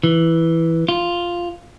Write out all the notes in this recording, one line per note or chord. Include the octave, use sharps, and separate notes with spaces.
E3
F4